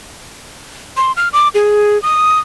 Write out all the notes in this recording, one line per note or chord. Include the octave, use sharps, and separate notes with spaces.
C6
F6
D6
G#4
D#6